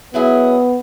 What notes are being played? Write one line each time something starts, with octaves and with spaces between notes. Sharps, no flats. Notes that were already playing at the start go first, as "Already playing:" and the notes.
F#3 B3 E4 G#4